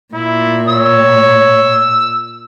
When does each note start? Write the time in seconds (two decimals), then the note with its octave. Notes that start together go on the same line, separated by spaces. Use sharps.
0.14 A#2 E4
0.68 C#5 E6